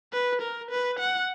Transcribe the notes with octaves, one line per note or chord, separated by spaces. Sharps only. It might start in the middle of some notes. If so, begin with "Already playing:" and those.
B4
A#4
B4
F#5